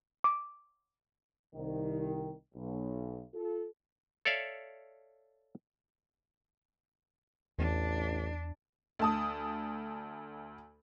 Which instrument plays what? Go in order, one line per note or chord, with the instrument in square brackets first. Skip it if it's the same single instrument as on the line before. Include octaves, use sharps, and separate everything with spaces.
[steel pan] D6
[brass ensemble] C2 D#3
B1
F4 A4
[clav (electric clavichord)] A4 C#5 D5 E5 F5
[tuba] A1 [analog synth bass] E2 [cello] D4
[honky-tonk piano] D2 A5 D#6